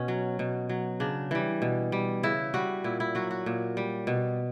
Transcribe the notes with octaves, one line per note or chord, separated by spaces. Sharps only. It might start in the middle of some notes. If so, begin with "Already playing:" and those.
Already playing: B2 C#4
F#3
B2
F#3
C#3 D4
E3 G3
B2
G3
C#3 E4
G3 F#4
A#2 E4
E4
F#3 F#4
F#4
A#2
G3
B2